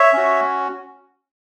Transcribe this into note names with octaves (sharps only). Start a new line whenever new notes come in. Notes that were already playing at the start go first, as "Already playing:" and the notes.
Already playing: C#5 E5
C#4 F#4